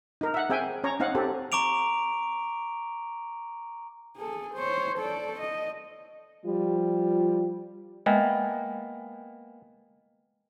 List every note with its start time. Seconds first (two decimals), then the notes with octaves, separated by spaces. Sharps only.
0.21 D#4 A#4
0.34 E5 F#5
0.50 C4 G#4 E5 G5 G#5
0.84 C#4 C#5 A#5
1.00 C4 D#4 F5 F#5
1.15 C4 G4 A4
1.52 A#5 C#6 D6 D7 F7
4.17 G#4 A4
4.54 C5 C#5
4.98 A4 D5
5.40 D#5
6.45 F3 G3 F4
8.06 G#3 A#3 B3 D#5 G5 G#5